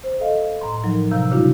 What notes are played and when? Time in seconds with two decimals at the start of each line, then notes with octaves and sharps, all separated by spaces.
0.03 C5
0.20 A4 D#5 F5
0.61 A2 A#5 C6
0.83 F3 F#3 D#4 A#4
1.11 C3 F5 A#5 E6 G6
1.31 A#2 C#3 G3 D4 E4 F#4